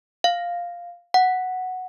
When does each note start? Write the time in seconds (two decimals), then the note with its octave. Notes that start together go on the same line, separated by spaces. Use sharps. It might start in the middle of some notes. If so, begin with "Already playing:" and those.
0.24 F5
1.14 F#5